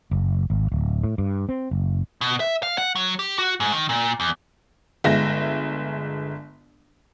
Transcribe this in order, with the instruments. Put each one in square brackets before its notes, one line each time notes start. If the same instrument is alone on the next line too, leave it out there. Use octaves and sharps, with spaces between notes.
[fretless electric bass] F#1
G#1
D1
A2
G2
C4
F#1
[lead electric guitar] B2
E5
F5
F#5
F#3
G4
F#4
G#2
D#3
A#2
E2
[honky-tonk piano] G1 G#3 E5 A#6